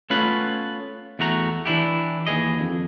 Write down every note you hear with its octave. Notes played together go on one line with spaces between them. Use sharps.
A3 B3 C#4 F4 B4
E2 A3 F#4 A#5
E3 D4 E4 G4
D#2 E3 G#4 D#5
F2